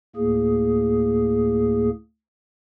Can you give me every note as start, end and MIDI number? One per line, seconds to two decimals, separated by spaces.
0.16 1.89 38
0.16 1.89 45
0.16 1.89 58
0.16 1.89 68